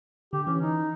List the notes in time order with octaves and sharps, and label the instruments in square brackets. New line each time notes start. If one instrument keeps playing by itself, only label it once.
[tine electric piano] D3 [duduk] G4
[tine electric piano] E3 [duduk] C#4
[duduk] D#4